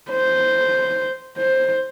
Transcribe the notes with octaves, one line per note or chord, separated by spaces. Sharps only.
C5
C5